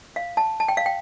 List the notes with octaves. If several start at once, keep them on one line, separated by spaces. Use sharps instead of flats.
F5
A5
A5
G5
F5
G5